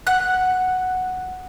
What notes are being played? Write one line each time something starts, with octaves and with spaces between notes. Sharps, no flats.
F#5 F#6